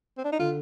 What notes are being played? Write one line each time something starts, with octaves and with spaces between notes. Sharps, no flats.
C4
D4
D#4
D3 F4